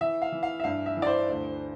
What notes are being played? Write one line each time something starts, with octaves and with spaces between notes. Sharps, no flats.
E3 E5
F5
E3
F5
E5
G2 F5
E5
E3
D5
C5
D2